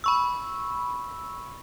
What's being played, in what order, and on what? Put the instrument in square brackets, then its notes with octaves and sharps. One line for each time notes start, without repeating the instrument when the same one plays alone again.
[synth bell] B5 C#6 E6